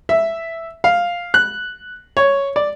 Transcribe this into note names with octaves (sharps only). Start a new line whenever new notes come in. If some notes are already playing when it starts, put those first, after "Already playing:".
E5
F5
F#6
C#5
D5